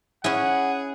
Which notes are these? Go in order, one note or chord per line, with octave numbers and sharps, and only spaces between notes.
C#4 E4 G#4 F#5